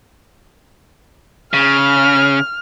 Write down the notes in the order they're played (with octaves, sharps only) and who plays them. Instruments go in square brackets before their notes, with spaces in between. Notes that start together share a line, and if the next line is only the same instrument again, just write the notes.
[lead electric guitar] C#3 [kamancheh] F6